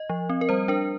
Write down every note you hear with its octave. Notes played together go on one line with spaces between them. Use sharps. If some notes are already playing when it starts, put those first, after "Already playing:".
Already playing: D#5
F3
C4
A#4
G3 C5
D4 A#4